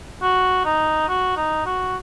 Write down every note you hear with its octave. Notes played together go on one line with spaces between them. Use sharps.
F#4
D#4
F#4
D#4
F#4